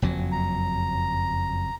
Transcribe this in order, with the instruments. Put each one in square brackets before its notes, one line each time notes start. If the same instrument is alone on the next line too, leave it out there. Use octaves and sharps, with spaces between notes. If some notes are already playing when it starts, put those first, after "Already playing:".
[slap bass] F#1 F2 F#3
[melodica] A#5